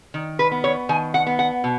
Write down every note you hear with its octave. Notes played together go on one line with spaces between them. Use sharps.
D#3
B4
B3
C#5
D#3 G#5
F#5
B3
F#5
B2